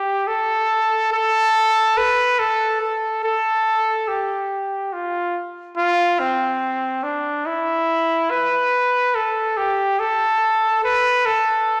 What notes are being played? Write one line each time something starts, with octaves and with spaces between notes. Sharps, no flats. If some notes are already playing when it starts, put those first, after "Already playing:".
Already playing: G4
A4
A4
B4
A4
A4
A4
G4
F4
F4
C4
D4
E4
B4
A4
G4
A4
B4
A4